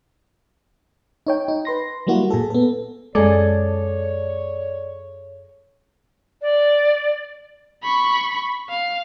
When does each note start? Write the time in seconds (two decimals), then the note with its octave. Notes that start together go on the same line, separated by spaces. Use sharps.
1.27 D#4 C#5 G5
1.48 D#4
1.65 B4 C6 A#6
2.07 F#3 G3 A#3 E4 F#4
2.30 A#2 G#4 A4
2.50 B3 A4
3.15 F#2 G#3 G#4 A4 C#5 D5
6.41 D5
7.83 B5 C#6
8.69 F5